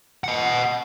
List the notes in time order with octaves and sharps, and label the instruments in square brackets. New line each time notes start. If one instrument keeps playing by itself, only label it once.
[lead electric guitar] D#5 F#5